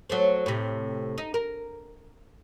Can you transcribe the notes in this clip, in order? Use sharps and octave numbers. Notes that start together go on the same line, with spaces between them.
F#3 A3 C4
A2 C3
D#4
A#4